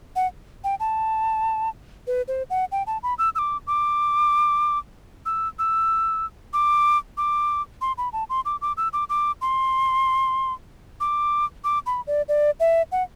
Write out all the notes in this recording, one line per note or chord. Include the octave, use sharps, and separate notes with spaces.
F#5
G5
A5
B4
C5
F#5
G5
A5
B5
E6
E6
D6
D6
E6
E6
D6
D6
C6
B5
A5
C6
D6
D6
E6
D6
D6
C6
D6
D6
B5
D5
D5
E5
F#5